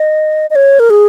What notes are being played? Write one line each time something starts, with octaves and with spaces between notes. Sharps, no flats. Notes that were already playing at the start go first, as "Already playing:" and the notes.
Already playing: D#5
D#5
C#5
A#4
G#4